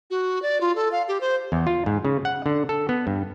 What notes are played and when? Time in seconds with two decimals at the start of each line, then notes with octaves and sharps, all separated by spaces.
0.10 F#4
0.42 D5
0.61 F4
0.75 A4
0.92 F5
1.08 G4
1.21 C5
1.52 E2
1.67 F4
1.86 G#2
2.05 C#3
2.25 F#5
2.46 D3
2.69 A4
2.89 B3
3.07 G2